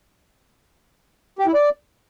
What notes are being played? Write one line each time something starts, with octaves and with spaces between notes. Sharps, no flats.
G4
E4
D5